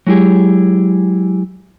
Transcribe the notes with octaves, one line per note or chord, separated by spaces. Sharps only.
F#3 G#3 E4 G4 G#4